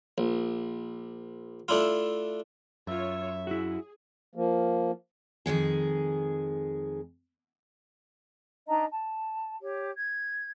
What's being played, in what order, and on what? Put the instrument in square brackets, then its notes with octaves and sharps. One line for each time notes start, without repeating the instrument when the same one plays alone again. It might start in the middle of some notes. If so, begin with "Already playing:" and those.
[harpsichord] A#1
A3 D4 E4 F4
[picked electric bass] F#2 [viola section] F4 C#5 [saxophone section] E5
[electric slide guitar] E4 F#4 [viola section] G#4
[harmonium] F3 A#3
[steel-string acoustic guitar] F2 D#3 G#3 G#4
[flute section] D4 D#4 D#5 A#5
A5
G4 C#5
G#6